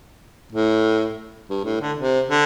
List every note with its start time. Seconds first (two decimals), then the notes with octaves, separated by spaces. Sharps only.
0.52 A2
1.49 G2
1.64 A2
1.81 D3
1.98 C3
2.29 D3